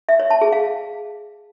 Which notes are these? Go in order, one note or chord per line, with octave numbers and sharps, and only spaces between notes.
E5
C#5
A5
G#4
F5